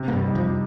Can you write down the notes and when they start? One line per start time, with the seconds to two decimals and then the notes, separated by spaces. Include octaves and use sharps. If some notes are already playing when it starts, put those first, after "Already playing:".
Already playing: C3
0.08 A#3
0.13 G2 G3
0.24 G3 D#4
0.35 F2 F3